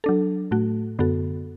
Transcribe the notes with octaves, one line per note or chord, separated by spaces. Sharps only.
F#3 D4 A4
A2 A3 F#4
F#2 D3 B3 F#4 A4